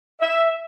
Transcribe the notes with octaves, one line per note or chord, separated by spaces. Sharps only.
E5